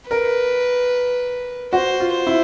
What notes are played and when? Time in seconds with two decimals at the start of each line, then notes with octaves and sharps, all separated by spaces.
0.10 A#4 B4
1.73 F#4 C5
2.00 F4
2.13 C5
2.27 E4